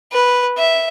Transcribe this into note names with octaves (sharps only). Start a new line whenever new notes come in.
B4
E5